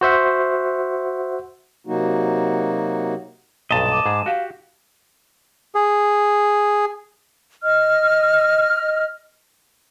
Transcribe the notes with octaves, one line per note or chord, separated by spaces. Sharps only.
F#4 C5 E5 F#5
C3 F#3 A#3 D#4 F#4
B1 G2 A#2 D#5 A5
D6
G#2 G#4
F#4 G4 F5
G#4
D#5 F6